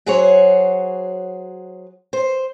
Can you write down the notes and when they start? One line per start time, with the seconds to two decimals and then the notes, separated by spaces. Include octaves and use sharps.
0.06 F#3 F#4 G#4 C5 C#5
2.13 C5